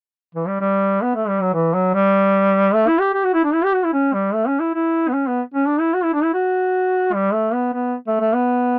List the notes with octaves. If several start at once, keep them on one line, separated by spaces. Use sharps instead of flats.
E3
G3
G3
B3
A3
G3
F#3
E3
F#3
G3
A3
E4
G4
G4
F#4
E4
D4
E4
G4
F#4
E4
C#4
G3
A3
C#4
E4
E4
B3
C#4
B3
C#4
D4
E4
F#4
E4
D4
E4
F#4
G3
A3
B3
B3
A3
A3
B3